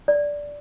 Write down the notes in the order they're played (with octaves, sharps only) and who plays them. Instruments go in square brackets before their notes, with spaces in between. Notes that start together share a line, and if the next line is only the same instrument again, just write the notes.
[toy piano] D5